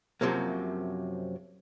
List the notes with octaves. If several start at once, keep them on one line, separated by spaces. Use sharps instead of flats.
F#2 C3 F3 F#3 A#3